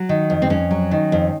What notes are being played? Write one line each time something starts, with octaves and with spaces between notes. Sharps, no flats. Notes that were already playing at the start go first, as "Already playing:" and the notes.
Already playing: F#3 F#4
D#3
F2
C4
F2 C#4
F#3
D#3
F2